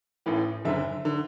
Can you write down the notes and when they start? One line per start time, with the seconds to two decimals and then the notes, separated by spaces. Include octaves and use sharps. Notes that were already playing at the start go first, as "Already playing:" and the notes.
0.26 A1 A2 E3
0.65 F#1 F#2 D3 E5
1.05 D3